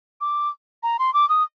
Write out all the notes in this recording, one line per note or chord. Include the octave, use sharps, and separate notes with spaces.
D6
A#5
C6
D6
D#6